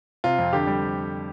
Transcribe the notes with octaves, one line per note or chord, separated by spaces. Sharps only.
C3 F4
F2
D3 G4
G3